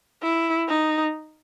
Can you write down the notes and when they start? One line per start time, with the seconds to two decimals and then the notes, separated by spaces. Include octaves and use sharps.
0.22 E4
0.68 D#4